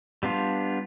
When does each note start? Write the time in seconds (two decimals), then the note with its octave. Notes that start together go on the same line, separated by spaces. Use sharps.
0.23 G3 B3 D4 F4